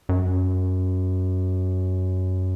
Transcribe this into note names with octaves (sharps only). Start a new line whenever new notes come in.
F#2